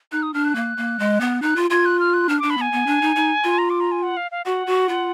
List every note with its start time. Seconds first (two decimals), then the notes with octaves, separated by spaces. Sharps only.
0.12 D#4 F#6
0.23 D#6
0.34 D4 F6
0.44 F#6
0.55 A#3
0.77 A#3
0.99 G#3
1.21 B3
1.42 D#4 F#6
1.56 F4
1.70 F4 G#6
1.86 F#6
2.00 F6
2.14 F#6
2.29 D4 F6
2.40 D4 D6
2.50 B5
2.57 B3 G#5
2.72 B3
2.87 D4
3.02 D#4
3.16 D#4
3.44 F4
3.58 A#5
3.70 D6
3.80 A#5
3.92 G#5
4.02 F#5
4.17 F5
4.31 F5
4.45 F#4 F#5
4.67 F#4
4.89 F4